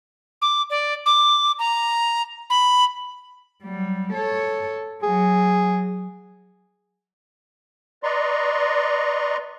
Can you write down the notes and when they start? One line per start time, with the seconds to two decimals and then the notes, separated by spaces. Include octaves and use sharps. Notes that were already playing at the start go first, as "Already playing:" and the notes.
0.42 D6
0.70 D5
1.06 D6
1.59 A#5
2.50 B5
3.64 F#3 G3
4.13 A4 C#5
5.03 F#3 G#4
8.03 B4 D5 D#5 A#5 C6 C#6